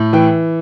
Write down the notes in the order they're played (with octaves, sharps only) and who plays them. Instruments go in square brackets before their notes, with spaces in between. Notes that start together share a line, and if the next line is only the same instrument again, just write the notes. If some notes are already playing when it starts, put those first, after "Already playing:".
Already playing: [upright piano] A2
E3 G5